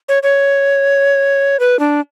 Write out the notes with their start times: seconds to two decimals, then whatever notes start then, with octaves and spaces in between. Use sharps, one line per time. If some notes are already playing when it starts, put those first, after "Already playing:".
0.09 C#5
0.23 C#5
1.60 B4
1.79 D4